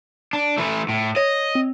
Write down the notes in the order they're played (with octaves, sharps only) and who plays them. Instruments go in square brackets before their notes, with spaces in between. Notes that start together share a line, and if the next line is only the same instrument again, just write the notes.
[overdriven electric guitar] D4
E3 A3
A2
[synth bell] C#5 [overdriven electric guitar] D#5
[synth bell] C4